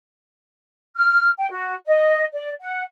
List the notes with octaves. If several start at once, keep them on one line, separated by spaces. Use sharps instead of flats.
F6
G5
F#4
D#5
D5
F#5